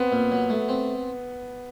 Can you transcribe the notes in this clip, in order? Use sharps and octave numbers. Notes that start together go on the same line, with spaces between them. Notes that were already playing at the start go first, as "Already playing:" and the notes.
Already playing: B3 C4
A#2
F#3
A3
C4